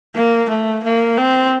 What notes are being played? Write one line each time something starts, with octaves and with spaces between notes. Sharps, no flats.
A#3
A3
A#3
C4